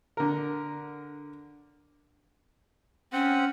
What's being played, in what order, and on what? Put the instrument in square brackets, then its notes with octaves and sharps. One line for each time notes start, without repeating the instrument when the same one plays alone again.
[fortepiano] D3 A#4
[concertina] C4 F#5 [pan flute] C#4